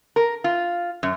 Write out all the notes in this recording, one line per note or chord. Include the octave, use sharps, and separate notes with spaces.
A#4
F4
F#2